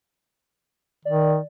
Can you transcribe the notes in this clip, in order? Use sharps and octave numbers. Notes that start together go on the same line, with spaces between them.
D#3 D5